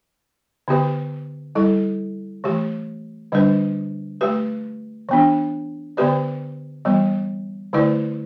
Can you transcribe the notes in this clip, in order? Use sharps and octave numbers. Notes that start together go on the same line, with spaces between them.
D3 B3 G4 B4
G3 E4 A4
E3 A3 G4
D3 G3 D4 B4
A3 G4 B4
E3 B3 D4
D3 B3 G4 B4 D5
E3 G3 B3
D3 A3 E4 B4 D5